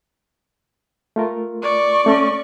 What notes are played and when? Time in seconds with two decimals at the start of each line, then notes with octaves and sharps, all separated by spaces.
1.16 A3 F4 A#4
1.62 D5 C#6
2.06 A3 C#4 A4